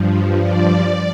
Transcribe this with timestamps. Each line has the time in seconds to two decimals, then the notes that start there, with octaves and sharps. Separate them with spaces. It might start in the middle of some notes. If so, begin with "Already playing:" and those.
Already playing: G2 F3
0.41 D5